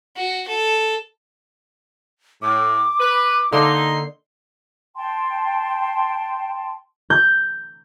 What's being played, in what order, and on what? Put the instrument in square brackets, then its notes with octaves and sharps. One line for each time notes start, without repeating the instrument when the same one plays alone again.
[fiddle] F#4
A4
[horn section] A2 [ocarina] D6
[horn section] B4
[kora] D3 A#3 A4 [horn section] D#4 C6
[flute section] G5 A5 C6
[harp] G6